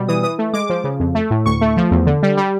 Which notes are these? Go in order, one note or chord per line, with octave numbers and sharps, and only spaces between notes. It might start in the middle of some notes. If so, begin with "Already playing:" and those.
Already playing: B2 G3
E3 D#6
E3 D#6
A3
G#3 D6
F3
C#3
F2
A3
A2
D2 C#6
A3
F3
E2
D3
G3
G3